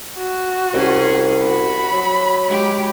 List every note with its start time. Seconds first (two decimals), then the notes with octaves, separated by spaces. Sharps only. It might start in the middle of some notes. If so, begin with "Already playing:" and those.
0.18 F#4
0.74 C2 C#4 G#4
1.44 F#4 B5
1.93 F#3
2.48 G#3 G4